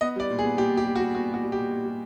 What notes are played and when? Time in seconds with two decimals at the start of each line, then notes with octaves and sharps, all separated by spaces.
0.01 B3 D#5
0.16 G3 D5
0.30 A#2
0.39 G#4
0.44 B3
0.57 A#2 G4
0.72 A#2
0.77 G4
0.86 G3
0.95 F#4
1.00 G3
1.15 B3 F#4
1.29 A#2
1.34 F#4
1.42 G3
1.52 G4
1.57 A#2
1.71 A#2
1.85 G3